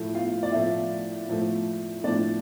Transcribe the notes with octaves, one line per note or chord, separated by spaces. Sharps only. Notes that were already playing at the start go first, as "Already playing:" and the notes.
Already playing: A2 F3 A3 E4
F4 F5
D5
A2 F3 A3 E4 E5
A2 F3 A3
A2 F3 A3 D4 D5